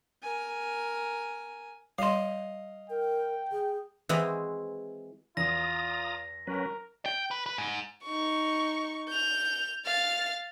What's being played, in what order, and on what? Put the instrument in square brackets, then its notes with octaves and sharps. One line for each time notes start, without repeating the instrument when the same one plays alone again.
[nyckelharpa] A#4 G#5
[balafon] G3 C6 [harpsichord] D#5 F5
[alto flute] A#4 [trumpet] G5
[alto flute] G#4
[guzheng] E3 G#3 C4 E4 F#4 D#5
[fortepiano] E2 [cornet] F4 [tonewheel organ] A#5 D#6 [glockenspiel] A#6
[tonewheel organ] F#3 C#4 B4 [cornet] A#4
[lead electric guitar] G5
B4
B4
G#2
[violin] D#4 C#6
G6 F7
F5 A6